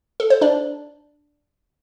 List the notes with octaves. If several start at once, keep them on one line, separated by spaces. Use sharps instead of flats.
A4
C5
D4 D5